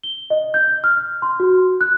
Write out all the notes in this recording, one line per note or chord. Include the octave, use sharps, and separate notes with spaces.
G7
D#5
G6
F6
C6
F#4
F#6